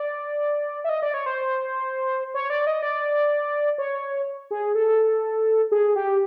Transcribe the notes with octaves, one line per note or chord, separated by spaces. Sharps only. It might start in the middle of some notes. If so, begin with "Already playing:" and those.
Already playing: D5
E5
D#5
D5
C#5
C5
C#5
D5
D#5
D5
C#5
G#4
A4
G#4
G4